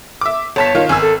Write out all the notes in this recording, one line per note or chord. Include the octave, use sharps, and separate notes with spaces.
E5 D6
G1 C#5 A5 B6
D#3 F4
G#1 G#5 E6
A4